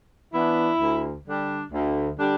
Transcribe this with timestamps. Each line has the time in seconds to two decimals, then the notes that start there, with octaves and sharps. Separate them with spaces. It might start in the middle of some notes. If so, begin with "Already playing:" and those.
0.32 E3 B3 D4 E4
0.79 D2
1.25 D3 G3 D4
1.71 D2
2.17 D3 G3 D4